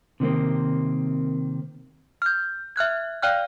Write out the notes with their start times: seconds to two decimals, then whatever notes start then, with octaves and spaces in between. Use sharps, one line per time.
0.20 C3 D#3 A#3 C4
2.22 F6 G6
2.76 E5 F6 F#6 G#6
3.22 D5 F5 G5 F6 F#6